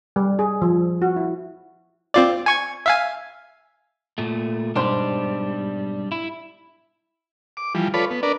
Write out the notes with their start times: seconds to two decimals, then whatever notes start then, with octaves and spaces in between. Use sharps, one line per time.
0.16 G3
0.39 G#4
0.62 F3
1.02 F#4
1.16 E4
2.14 C4 F4 D5
2.46 G#5 C#6 G#6
2.86 E5 F5 G#5
4.18 A#2 A3
4.76 B1 G#2 G3 D4 C5
6.12 E4
7.57 D6
7.75 E3 F3 G3
7.94 F4 A4 B4 C#5 D5 B5
8.11 B3
8.23 D4 A#4 B4 D5